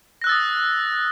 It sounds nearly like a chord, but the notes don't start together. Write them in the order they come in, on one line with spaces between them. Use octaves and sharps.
A#6 F#6 E6 A6 D#6